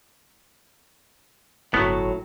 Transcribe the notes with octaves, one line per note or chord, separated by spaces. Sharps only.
G1 A2 F#3 B3